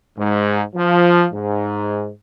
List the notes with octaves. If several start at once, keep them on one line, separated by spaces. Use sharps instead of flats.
G#2
F3
G#2